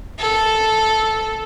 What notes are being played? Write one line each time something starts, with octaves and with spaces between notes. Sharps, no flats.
A4